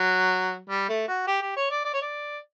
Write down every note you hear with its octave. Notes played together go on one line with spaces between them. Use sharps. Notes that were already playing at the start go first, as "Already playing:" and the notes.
Already playing: F#3
G3
A3
F#4
G4
G4
C#5
D5
D5
C#5
D5